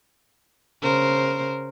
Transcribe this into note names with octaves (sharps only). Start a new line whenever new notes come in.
C#3 A#4 C5